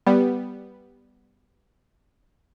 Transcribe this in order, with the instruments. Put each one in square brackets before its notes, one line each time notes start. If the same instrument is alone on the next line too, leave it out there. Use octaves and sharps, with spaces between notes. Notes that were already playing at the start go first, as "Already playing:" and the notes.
[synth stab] G3 B3